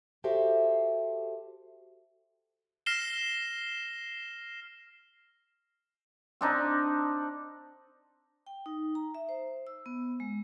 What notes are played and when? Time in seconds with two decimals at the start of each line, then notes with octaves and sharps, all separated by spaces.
0.24 F#4 G4 A4 C5 E5
2.86 F6 A#6 C7 E7 G7
6.41 C4 D4 D#4
8.46 G5
8.66 D#4
8.95 A#5
9.15 E5
9.29 C5
9.67 E6
9.86 B3
10.20 G#3